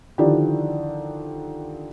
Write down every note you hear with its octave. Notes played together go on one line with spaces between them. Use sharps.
D3 D#3 F3 D4 E4 G4